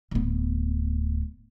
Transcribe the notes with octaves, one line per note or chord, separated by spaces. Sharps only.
D1 B3